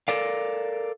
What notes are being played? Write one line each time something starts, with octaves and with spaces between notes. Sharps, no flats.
A4 A#4 D5 F5